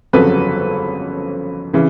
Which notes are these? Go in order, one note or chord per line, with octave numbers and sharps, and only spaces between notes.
G1 F2 C#3 F#3 A4 B4
C#3 E3